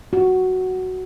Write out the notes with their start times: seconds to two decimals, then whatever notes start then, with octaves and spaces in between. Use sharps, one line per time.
0.13 F#4